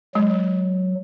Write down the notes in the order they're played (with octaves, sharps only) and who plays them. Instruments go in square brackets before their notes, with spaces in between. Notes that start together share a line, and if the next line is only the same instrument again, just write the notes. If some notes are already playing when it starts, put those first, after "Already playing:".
[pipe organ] F#3 [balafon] G#3